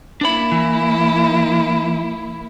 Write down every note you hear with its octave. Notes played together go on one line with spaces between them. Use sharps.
A#3 D4 E4 B5
E3